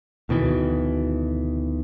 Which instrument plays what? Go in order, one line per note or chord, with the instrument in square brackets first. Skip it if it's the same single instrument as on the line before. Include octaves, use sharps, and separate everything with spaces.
[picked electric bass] D2 B2 D#3 E3